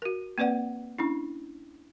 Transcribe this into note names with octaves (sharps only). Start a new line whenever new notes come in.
F#4 A#4
A#3 C4 B4 D5 F#5
C#4 D4 E4